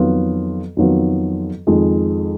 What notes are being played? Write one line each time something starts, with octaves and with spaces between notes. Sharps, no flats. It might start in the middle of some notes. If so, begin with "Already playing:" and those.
Already playing: F2 D#3 F#3 B3 F4
F2 D#3 F#3 B3 F4
F2 D#3 G#3